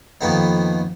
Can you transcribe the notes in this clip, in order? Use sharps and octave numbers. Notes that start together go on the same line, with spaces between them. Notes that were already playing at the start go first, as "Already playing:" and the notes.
F2 D#3 A#3 B3 D#4